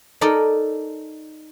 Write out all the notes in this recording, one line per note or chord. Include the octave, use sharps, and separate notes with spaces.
D#4 A4 A#4 D5 D#5